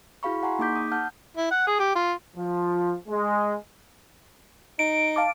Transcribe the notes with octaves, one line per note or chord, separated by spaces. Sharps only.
E4 F#4 G#4 F5 B5 C#6
F#5 G#5 A#5 C6 C#6
A#3 D#4 G#4 D6 G6 B6
D#6
F#5 A5 F6 G6
E4
F#5
G#4
G4
F4
F3
G#3
D#4 D7
F5 A5 D6